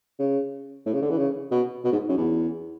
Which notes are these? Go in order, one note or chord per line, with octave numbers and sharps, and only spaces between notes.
C#3
A2
C#3
D3
E3
C#3
B2
B2
G#2
F#2
E2